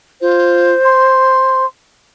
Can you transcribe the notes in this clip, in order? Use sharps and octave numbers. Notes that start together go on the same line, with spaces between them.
F4 C5
C6